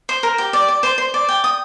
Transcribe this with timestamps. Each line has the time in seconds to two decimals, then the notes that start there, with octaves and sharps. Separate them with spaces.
0.09 C5
0.23 A#4
0.38 G4
0.53 D5
0.68 D5
0.83 C5
0.98 C5
1.14 D5
1.29 G5
1.44 D#6